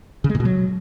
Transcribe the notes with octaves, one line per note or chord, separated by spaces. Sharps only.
C#3
G#3
A#2
B2
F#3